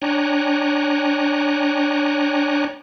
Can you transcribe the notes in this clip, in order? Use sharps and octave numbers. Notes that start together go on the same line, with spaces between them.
D4 C#5 G5 G#5 A#5 F#6